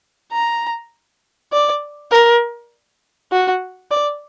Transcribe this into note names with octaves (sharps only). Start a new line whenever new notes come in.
A#5
D5
A#4
F#4
D5